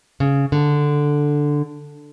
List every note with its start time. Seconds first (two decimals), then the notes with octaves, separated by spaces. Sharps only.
0.20 C#3
0.52 D3